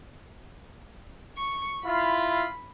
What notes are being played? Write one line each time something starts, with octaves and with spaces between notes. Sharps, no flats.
C#6
E4 F4 B5